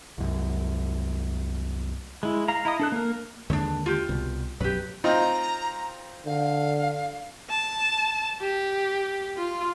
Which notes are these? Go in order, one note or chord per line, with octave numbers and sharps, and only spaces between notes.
C2 F#2
G#3 E4
F5 A#5
E4 D#5 D#6
D4 A4 F#6
A#3 A#4
D#2 D3 G#3 C#4 D4
F4 G4
C2 B2
B1 F#2 F#3 G4 B4
C4 D#4 F4 A#5
D3 F5
A5
G4
F4